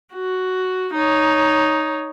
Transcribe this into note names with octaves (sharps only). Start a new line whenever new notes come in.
F#4
D#4 C#5